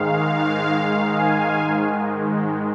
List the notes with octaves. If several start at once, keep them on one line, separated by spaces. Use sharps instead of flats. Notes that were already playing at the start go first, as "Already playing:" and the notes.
Already playing: G#2 D#3 G#3 F5
G#5
G#2 D#3 G#3